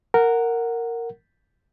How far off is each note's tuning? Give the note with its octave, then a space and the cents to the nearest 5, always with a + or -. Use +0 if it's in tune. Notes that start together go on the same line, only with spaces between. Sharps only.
A#4 -10 F#5 +0